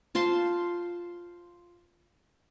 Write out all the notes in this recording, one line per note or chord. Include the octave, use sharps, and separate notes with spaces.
F4 C5 A5 C6